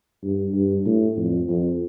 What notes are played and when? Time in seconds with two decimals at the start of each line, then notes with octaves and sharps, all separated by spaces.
0.23 G2
0.54 G2
0.86 A2
1.17 F2
1.48 F2